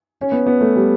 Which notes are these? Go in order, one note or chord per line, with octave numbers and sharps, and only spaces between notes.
C#4
B3
B3
A3
G3